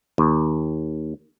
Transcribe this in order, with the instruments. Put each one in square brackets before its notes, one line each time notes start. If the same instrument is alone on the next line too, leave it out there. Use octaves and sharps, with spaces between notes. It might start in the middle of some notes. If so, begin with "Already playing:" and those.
[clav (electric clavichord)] D#2